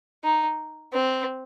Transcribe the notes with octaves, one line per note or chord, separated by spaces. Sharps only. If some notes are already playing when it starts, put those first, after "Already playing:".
D#4
C4